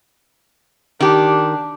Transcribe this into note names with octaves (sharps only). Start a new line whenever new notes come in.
D#3 D4 G4